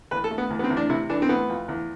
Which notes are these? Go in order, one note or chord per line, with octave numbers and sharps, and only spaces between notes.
E2 B4
A4
A3
B3
E2
B3
C4
E2
D4
C3 E4
E3 D4
C4
E3 B3
F2
E2